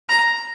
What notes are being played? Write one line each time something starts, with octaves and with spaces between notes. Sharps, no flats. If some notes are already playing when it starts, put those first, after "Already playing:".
A#5